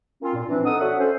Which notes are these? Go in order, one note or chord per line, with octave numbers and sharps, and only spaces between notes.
A#3 C4 C#4 F4
A#2
E3 F3 C4 D4
D#4 A4 F#5 D#6
D4 F#4 A4 C#5 E5 F#5
C#4 A4 C5